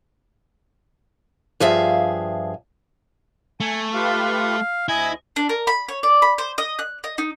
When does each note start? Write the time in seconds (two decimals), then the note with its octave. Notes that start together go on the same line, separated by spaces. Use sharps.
1.60 G2 F3 G#4 E5 F5
3.60 A3 G#5
3.94 F4 G4 B4 F5
4.88 D2 E4 D#5 G#5
5.36 D4
5.49 A#4
5.67 B5
5.88 C#5
6.03 D5
6.22 B5
6.38 C5
6.58 D#5
6.79 F#6
7.04 D#5
7.18 D#4